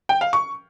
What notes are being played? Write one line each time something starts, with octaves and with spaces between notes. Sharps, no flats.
G5
F5
C#6